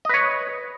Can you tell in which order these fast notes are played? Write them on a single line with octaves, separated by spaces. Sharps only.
D#5 B4 C#5